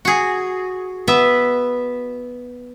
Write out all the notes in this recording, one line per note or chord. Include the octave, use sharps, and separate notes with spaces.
F#4 G#4
B3 B4 E5